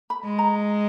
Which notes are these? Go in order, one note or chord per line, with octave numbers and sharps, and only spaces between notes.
B5
G#3
A#5